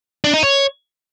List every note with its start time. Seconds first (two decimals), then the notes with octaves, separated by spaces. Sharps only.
0.24 D4
0.34 D#4
0.43 C#5